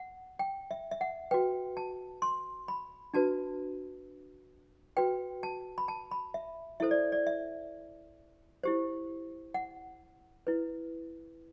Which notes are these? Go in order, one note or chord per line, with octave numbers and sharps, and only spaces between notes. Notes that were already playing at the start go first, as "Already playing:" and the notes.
Already playing: F#5
G5
E5
E5
F#5
F#4 B4 G5
A5
C6
B5
D4 F#4 B4 A5
F#4 B4 G5
A5
B5
A5
B5
E5
E4 A4 C5 E5
D5
D5
E5
E4 G4 C5
F#5
E4 B4